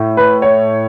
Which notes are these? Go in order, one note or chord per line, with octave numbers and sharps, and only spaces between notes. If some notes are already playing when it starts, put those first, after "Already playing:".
Already playing: A2
B4
C#5